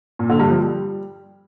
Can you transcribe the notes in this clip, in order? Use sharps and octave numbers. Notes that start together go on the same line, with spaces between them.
A#2
D3
G2
F3
G3